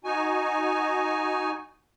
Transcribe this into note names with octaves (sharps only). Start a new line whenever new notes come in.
D#4 F#4 G#5